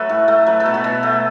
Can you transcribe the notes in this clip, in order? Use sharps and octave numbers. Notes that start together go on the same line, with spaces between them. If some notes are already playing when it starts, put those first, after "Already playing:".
Already playing: F#3 A3 F#4 A4 B4 C#5 E5
A2
A3
F#3 B4
A4
B2
F#4 B4
B2
A3